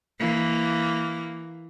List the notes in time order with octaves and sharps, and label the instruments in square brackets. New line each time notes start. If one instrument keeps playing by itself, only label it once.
[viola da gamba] E3 A#3